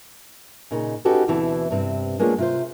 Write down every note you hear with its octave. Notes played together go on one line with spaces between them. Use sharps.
A#2 C#3 D#4
C#4 D#4 F#4 G4 A4 B4
D2 B2 E3 C4 E4 A5
G2 C3 C4
G#3 A#3 B3 D4 F4 C#5
C3 F4 C5